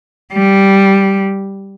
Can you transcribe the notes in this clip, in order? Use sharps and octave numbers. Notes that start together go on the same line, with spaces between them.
G3